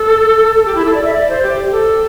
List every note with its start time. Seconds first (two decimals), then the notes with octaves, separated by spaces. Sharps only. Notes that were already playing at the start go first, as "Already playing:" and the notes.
Already playing: A4
0.55 A4
0.65 G4
0.75 E4
0.85 A4
0.94 D5
1.04 E5
1.14 D5
1.29 C5
1.42 G4
1.71 A4